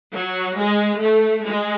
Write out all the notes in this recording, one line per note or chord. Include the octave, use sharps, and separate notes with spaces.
F#3
G#3
A3
G#3